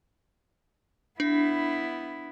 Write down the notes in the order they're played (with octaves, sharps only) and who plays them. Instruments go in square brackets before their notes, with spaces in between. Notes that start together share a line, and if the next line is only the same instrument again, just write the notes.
[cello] B3 E4 [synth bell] D4